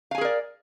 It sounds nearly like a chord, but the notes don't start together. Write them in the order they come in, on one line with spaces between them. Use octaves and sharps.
F5 G#5 G#4 A#4 D5